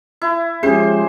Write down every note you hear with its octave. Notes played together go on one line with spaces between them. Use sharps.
E4
F3 G#3 C#4 G4 G#4 C5